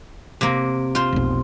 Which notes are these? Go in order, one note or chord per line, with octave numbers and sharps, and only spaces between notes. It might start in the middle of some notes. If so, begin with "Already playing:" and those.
C3 A#3
F4 C5
F1 B1